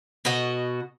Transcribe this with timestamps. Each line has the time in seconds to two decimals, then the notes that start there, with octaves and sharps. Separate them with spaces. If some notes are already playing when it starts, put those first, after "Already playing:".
0.25 B2 F#4 D#5